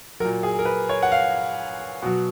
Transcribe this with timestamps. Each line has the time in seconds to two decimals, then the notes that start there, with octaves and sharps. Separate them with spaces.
0.20 F#3 A#4
0.25 A#2
0.43 G#4
0.59 A#4
0.65 B4
0.89 C#5
1.03 F#5
1.12 F5
2.02 B2 F#3